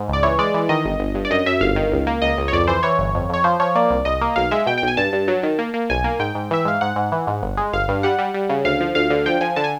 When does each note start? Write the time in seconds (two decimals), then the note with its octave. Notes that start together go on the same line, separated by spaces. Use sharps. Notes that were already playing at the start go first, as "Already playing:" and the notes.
Already playing: G#2
0.08 C#2 D5
0.23 E3 C#5
0.39 G#3 D5
0.54 E3
0.69 D#3 D#5
0.85 G1
1.00 G1
1.15 G2
1.25 D5
1.30 F#2 D#5
1.46 F#2 E5
1.61 G1 F5
1.76 D#3
1.92 C#2
2.07 A#3
2.22 C#2 D#5
2.38 C#2
2.48 C#5
2.52 F2 D5
2.68 E3 C5
2.83 E3 C#5
2.98 G1
3.15 F2
3.29 F2 C#5
3.44 F3 C5
3.60 F3 C#5
3.75 A#3 D5
3.90 C2
4.05 C2 D#5
4.21 A#3
4.36 B1 F5
4.51 G#3 E5
4.66 B2 G5
4.78 G5
4.83 B1 G#5
4.97 G2 A5
5.13 G2
5.28 F#3
5.43 D#3
5.59 A#3
5.74 A#3
5.90 B1 G#5
6.04 A#3
6.19 G#2 G5
6.35 G#2
6.51 E3 E5
6.65 G#2 F5
6.81 G#2 F#5
6.96 G#2
7.12 E3
7.27 G#2
7.42 G1
7.57 G#3
7.73 G1 F5
7.88 G2
8.03 G3 F#5
8.19 G3
8.34 G3
8.49 C#3
8.65 D2 F5
8.80 F3
8.95 D2 F5
9.10 D3
9.26 F3 G5
9.41 F3 G#5
9.56 D3 A5
9.64 G#5